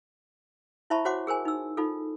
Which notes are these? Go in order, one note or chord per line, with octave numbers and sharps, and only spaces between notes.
E4 C5 E5 A5 B5 C#6
F#4 C5 C#5 F#5 C6 D6
G#4 A#4 C5 G#5
D#4 E6
D#4 F4 A4